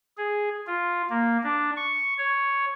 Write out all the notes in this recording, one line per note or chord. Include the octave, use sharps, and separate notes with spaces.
G#4
F4
A#3
D4
C#6
C#5